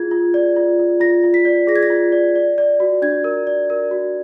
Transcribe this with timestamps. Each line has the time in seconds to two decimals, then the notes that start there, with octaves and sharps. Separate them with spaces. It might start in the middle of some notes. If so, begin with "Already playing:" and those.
Already playing: F4 G#4 G#6
0.11 F4
0.34 D5
0.56 F4
0.79 F4
1.00 F4 A#6
1.24 F4
1.34 B6
1.45 D5
1.67 G#4 A#6
1.76 G#6
1.83 A#6
1.90 F4
2.12 D5
2.36 D5
2.58 D5
2.80 F#4
3.02 D4 G#6
3.24 A#4
3.47 D5
3.70 A#4
3.91 F#4